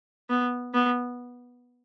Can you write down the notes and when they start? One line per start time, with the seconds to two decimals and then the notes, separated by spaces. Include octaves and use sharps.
0.30 B3
0.74 B3